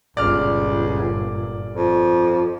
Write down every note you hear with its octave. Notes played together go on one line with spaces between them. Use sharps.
G1 C#2 A#2 D5 F6
F2